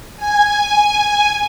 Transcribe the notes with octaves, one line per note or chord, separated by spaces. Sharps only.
G#5